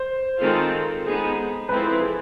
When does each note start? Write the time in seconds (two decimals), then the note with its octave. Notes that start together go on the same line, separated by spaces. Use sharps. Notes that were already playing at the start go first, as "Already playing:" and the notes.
Already playing: C5
0.41 D#3 G#3 C4 F4 A4
1.05 G#3 B3 D#4 G#4
1.69 F3 G#3 C4 E4 A4 B4
2.01 G#4